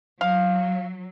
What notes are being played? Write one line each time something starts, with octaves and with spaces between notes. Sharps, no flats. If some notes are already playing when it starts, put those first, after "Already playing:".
F#3 F5